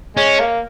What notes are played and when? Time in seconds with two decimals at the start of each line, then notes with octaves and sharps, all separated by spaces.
0.17 G#3 C#4
0.40 A#3